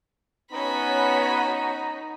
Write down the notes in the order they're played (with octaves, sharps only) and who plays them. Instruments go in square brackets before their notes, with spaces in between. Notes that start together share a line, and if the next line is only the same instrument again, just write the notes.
[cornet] B3 [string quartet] C#4 C#5 [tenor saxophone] D#4 [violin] F#4 B5